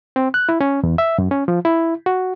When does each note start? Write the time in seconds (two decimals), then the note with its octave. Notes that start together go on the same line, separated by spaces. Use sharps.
0.16 C4
0.34 F#6
0.49 E4
0.61 C#4
0.83 E2
0.98 E5
1.18 F#2
1.31 C#4
1.48 F3
1.65 E4
2.06 F#4